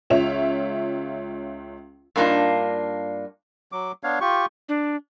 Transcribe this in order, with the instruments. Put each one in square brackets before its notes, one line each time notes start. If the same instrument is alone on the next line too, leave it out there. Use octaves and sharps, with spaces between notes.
[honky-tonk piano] C#2 F4 C#5 E5 F7
[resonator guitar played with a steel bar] G2 A#3 D4 D#4 F4
[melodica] F#3 D6
B3 D4 C#5 F5
F4 G4 C#6
[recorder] D4